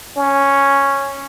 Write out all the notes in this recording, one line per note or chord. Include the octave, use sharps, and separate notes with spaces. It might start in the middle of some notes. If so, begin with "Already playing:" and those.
C#4